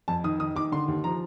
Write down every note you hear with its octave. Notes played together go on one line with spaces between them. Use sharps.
F2 A5
D#3 D#6
D#3 D#6
D#3 D6
D3 C6
D#2
F3 A#5